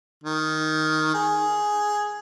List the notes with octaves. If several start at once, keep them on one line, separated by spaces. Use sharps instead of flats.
D#3
G#4